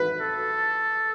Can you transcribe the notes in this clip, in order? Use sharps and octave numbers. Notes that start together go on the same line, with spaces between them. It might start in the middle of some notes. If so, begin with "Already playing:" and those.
Already playing: B4
A4